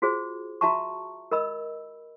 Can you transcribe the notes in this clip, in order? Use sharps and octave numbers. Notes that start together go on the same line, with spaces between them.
F4 F#4 G#4 C5
F#4 E5 A5 A#5 C#6
A#4 D#5 B5 E6